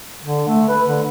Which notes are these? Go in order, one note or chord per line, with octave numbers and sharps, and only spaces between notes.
D3
A3
B4
D3